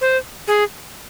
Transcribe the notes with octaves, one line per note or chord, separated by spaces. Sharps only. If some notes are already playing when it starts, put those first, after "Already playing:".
C5
G#4